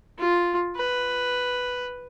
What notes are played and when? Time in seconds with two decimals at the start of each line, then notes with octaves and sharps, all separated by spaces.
0.19 F4
0.77 B4